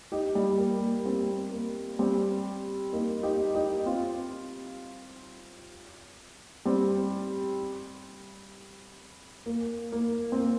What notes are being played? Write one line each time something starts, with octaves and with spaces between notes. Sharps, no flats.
D#4 G4
G3
A#3
A#3
G3 C4
A#3
G3 C4
A#3 D#4
D#4 G4
D#4 G4
C4 F4
G3 C4
A#3
A#3
C4
A#3